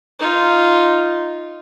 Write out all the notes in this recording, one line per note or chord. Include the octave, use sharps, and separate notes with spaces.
D#4 F4